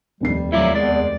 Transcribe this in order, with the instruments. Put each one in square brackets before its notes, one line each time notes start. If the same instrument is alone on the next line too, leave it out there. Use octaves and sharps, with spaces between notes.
[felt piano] F1 D#2 C7 [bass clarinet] G3
[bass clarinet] F#3 [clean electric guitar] A3 F4 D5 [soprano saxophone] E4
[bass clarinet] E2 [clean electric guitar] G#3 [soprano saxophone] D5